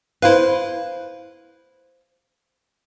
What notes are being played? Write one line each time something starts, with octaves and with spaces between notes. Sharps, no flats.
E4 B4 C5 F5